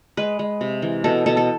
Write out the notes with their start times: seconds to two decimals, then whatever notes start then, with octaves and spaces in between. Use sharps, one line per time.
0.17 G#3 B4
0.39 G#3
0.61 C3
0.82 E3
1.04 B2 A4
1.26 B2 A4
1.37 A4